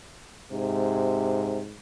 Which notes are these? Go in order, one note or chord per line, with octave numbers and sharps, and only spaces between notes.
G#2 C3